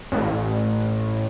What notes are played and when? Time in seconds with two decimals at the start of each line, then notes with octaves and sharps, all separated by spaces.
0.12 A1